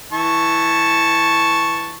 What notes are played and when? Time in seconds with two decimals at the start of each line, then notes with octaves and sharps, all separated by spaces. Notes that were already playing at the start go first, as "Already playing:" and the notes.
0.13 E3 A5 C#6